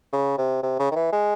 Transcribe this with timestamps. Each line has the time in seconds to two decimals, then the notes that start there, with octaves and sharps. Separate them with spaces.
0.13 C#3
0.38 C3
0.63 C3
0.79 C#3
0.91 D#3
0.96 E3
1.13 G#3